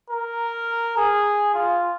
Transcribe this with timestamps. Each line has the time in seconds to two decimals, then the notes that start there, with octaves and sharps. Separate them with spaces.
0.10 A#4
0.97 G#4
1.54 F4